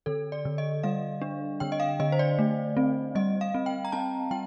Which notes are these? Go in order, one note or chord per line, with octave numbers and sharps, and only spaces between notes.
D3 A4
D5
D3
D#5
G3 F5
D4
D3 G5
D#5
F5
D3 D#5
C5
D5
A3
C4
G3 D#5
F5
C4
G5
A#5
C4 A5
G3 G5